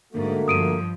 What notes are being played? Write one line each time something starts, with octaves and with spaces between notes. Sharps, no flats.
G#2 D3 A3 A#3 F#4
G2 F3 D#6 D7 D#7